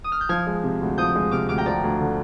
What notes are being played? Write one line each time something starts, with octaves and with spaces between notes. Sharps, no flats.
D#6
F6
G6
F3 F6 G#6
G#3
C3
D2
F3 D#6 G6
G#3
C3 D6 F6
D2 D6 F6
G5 A#5
F3 D5
D2
D3